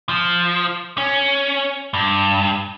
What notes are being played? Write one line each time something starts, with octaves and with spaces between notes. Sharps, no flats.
F3
C#4
G2